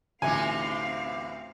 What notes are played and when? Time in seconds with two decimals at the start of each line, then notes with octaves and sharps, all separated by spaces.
0.22 A1 D2 C3 E3 C4 D#4 F5 G#5